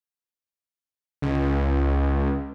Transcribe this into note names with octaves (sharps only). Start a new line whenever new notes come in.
C#2